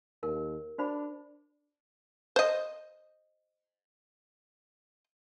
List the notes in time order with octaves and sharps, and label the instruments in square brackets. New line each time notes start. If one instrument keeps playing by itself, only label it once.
[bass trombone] D#2 [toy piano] A#4
[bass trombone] D4 [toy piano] F#4 C5 B5
[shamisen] C5 D#5